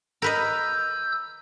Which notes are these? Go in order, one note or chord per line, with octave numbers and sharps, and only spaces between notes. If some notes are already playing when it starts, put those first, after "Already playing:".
A#4 B4 D#5 E6 G6